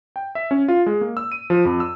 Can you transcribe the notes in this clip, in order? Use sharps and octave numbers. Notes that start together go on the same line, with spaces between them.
G5
E5
C#4
F4
G#3
A#3
E6
D#7
F3
F2
E6